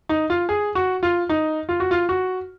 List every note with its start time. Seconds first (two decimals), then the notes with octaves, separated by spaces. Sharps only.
0.09 D#4
0.30 F4
0.49 G#4
0.75 F#4
1.03 F4
1.29 D#4
1.69 F4
1.80 F#4
1.91 F4
2.09 F#4